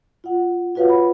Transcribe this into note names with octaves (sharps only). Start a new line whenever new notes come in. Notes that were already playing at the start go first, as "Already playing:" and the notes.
F4 F#5
F4 F#4 B4 C#5 F5 F#5
B5